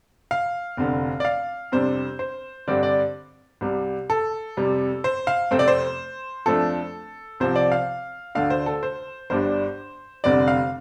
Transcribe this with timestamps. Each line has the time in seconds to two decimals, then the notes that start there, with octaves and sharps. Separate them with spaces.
0.31 F5
0.77 F1 F2 D3
1.20 D5
1.25 F5
1.72 F2 C3 G3 D4 C5
2.19 C5
2.67 G2 D3 G3 C4 D5
2.83 D5
3.61 C2 C3 G3
4.10 A4
4.57 F2 C3 G3
5.04 C5
5.27 F5
5.51 F2 C3 A3 C4 C5
5.59 D5
5.68 C5
6.46 F2 F3 A3 D4 A4
7.40 C2 C3 F3 C4 C5
7.56 D5
7.72 F5
8.35 D2 D3 A3 D4 F5
8.50 C5
8.66 A4
8.83 C5
9.30 G1 G2 G3 D4 C5
10.24 F1 F2 D3 G3 C4 D5
10.48 F5